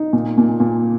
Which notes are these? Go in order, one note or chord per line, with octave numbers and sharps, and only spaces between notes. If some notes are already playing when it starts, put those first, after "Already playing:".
Already playing: D#4
A#2
A#2
A#2